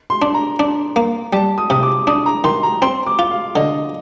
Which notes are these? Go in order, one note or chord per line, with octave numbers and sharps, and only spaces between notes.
C6
D4
A#5
D4
A#3
G3 A5
D#6
C3 D#6
D6
D4 D#6
A#5
D#3 C6
A#5
C4 C6
D6
F4
F5
D3 D#5